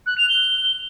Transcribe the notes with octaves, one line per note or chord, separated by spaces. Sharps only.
F#6
F7
G7